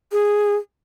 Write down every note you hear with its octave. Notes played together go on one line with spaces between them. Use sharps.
G#4